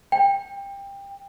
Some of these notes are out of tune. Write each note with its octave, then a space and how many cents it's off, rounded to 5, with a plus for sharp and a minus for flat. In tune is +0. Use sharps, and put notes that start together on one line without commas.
G5 +20